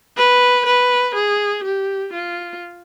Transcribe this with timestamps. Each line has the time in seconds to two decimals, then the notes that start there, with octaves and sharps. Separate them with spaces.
0.17 B4
0.66 B4
1.15 G#4
1.64 G4
2.13 F4